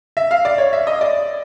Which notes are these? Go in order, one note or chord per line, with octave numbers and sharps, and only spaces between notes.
E5
F5
D5
C#5
E5
D#5
D5